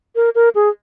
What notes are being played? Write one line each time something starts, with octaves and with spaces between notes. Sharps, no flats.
A#4
A#4
G#4